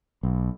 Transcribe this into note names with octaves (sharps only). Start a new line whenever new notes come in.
B1